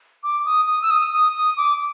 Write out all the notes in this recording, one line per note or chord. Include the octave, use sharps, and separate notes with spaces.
D6
D#6
D#6
E6
D#6
D#6
D#6
D6